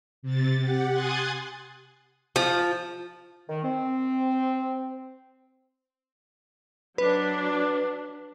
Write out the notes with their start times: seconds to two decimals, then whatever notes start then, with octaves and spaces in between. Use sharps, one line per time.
0.23 C3 A6
0.61 G4 F#5
0.91 G#5 C6 D#6 F#6 G#6 A6
2.36 F3
3.48 D#3
3.63 C4
6.98 F#3 D4 B4